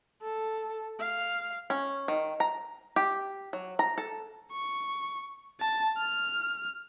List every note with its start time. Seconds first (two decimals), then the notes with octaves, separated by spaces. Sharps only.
0.22 A4
1.00 F5
1.70 C#4
2.08 D#3
2.40 A#5
2.96 G4
3.53 F#3
3.79 A#5
3.98 A4
4.52 C#6
5.60 A5
5.97 F6